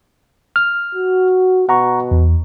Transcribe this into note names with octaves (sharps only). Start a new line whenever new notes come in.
F6
F#4
B2 F#5 A#5 C#6
E2